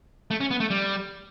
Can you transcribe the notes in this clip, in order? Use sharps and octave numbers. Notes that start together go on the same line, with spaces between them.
A3
C#4
B3
A3
G3